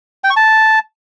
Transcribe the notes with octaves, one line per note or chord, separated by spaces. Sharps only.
G5
C#6
A5